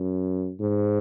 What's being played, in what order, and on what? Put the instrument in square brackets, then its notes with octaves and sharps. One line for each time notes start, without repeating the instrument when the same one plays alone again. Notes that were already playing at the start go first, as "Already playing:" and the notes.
Already playing: [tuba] F#2
G#2